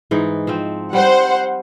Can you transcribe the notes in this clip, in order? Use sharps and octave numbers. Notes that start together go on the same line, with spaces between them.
G#2 E3 D#4
F3 C4
G3 C5 F#5